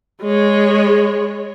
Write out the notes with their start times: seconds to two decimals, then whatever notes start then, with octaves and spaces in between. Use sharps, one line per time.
0.21 G#3 C#5